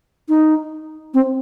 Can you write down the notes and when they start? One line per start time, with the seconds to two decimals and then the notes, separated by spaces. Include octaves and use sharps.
0.29 D#4
1.14 C4